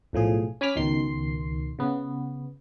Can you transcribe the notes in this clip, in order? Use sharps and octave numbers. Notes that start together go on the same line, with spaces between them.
B1 A2 F3 G#4
C#4 G#5 B5 D6 F6 B6
C#2 B2 D#3 C6 C7
C#3 B3